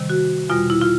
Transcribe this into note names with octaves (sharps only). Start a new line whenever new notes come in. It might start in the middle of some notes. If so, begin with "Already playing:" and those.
Already playing: C3 D#3 G3
F#4
E2 B2 G3 F4
E4
F4